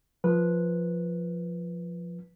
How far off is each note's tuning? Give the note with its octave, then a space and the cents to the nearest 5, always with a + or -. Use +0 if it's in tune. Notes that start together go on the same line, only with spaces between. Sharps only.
F3 +0 B4 -10